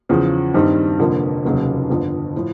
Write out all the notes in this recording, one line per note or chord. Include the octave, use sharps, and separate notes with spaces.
E2 C#3 F3
G2 D#3 G3 C4 D#4
F1 F2 D3 F3 A#3
F1 D#2 C#3 F#3
G1 F2 D3
A2 F3